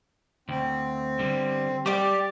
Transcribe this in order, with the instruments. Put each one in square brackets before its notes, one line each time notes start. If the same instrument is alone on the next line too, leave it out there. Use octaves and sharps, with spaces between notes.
[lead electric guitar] D2 [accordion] C4
[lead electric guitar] D3 G3
[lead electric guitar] G3 [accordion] G4 [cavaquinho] D5 D6